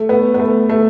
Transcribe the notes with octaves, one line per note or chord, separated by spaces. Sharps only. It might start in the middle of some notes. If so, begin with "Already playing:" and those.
Already playing: A3
B3
B3
A3
A3